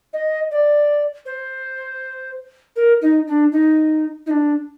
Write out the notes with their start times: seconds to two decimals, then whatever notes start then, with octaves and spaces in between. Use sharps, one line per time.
0.13 D#5
0.51 D5
1.26 C5
2.76 A#4
3.01 D#4
3.27 D4
3.52 D#4
4.26 D#4
4.30 D4